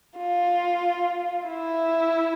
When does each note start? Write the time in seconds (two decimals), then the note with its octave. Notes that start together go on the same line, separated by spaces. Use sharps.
0.18 F4
1.47 E4